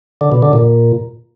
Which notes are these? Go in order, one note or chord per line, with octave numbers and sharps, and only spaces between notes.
D3
B2
D3
A#2